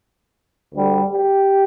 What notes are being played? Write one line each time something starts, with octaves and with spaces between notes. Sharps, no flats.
D2 D3 G3
G4